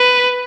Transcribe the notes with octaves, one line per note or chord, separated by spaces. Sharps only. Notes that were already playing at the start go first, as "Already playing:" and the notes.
Already playing: B4